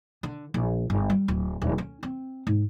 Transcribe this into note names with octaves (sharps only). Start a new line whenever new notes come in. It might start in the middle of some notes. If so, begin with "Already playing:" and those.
D3
A#1
G1
G3
D1
D1
C#4
C4
G#2